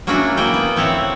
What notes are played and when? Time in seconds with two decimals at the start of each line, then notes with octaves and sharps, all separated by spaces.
0.07 F#3 A#3 C#4 D4 E4 F#4
0.37 A#3 E4 G5
0.54 B3
0.76 A2 C4 E4 C#5 E5 F#5